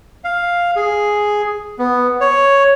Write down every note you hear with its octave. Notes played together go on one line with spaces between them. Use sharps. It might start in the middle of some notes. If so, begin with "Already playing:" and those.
F5
G#4
B3
C#5